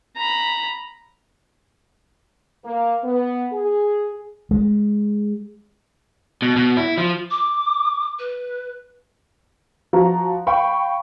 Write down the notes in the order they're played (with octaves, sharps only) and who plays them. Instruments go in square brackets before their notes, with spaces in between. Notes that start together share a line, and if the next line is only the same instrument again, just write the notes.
[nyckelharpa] A#5 B5
[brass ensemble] A#3
B3
G#4
[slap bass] G#3
[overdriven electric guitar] B2
B2
E4
F3
[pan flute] D6
B4
[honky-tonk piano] F3 F#4 A#5
F5 G5 B5 C#6